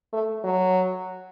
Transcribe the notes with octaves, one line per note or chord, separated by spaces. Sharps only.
A3
F#3